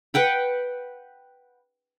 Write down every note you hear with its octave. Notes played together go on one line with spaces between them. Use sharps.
B4 F#5 G5 B5